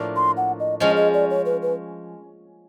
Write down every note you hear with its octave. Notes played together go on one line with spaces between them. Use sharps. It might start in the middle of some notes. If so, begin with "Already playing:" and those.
Already playing: A2 F3 A#3 D4 F4
C6
F#5
D#5
F3 G#3 C#4 D#5
D#5
D5
C#5
B4
B4